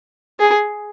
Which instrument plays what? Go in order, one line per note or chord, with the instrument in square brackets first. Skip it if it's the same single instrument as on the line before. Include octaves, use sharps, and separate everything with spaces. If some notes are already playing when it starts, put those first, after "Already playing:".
[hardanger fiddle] G#4